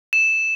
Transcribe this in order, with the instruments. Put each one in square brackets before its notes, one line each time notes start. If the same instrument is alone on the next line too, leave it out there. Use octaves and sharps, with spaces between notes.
[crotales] E7